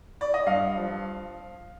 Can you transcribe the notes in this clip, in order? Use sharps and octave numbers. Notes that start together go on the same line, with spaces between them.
D5
D#5
G2 F5
F3